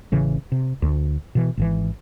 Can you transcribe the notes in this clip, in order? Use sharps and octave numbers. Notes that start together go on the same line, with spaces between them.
A1 C#3 E3
C3
D2
B2 E3
G#1 B2 E3